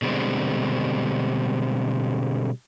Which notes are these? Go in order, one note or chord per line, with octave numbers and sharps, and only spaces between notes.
B2 D3 G3 G#3 C4